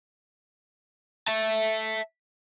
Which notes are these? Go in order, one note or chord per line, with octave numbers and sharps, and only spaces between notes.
E5 A5